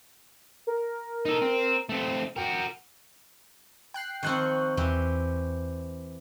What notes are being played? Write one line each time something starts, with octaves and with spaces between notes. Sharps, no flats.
A#4
D#4 A4
C4
A3 C4
F#4 A#4 G5
G5 F#6 C7
D#3 F3 C4 C#6 F#6
E2 E3 C4 G4